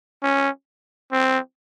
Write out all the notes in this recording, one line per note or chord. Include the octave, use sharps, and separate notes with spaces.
C#4
C4